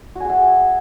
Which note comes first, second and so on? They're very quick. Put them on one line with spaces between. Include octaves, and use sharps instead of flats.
F#4 G#5 G#4 E5